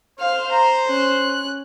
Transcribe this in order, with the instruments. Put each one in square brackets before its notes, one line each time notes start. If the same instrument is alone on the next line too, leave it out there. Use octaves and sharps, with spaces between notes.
[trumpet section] C5 [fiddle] F5 F6
[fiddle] A#5
C#4 F#6